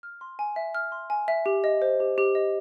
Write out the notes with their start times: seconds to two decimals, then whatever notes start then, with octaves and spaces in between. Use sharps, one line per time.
0.03 F6
0.21 C6
0.39 G#5
0.56 E5
0.75 F6
0.92 C6
1.10 G#5
1.28 E5
1.46 G4
1.64 D#5
1.82 C5
2.00 G4
2.18 G4
2.35 D#5